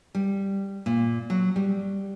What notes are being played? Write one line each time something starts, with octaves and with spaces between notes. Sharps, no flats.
G3
A#2
F#3
G3